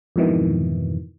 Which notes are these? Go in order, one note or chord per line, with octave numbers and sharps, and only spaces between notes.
F2 G#2 B2 D#3 E3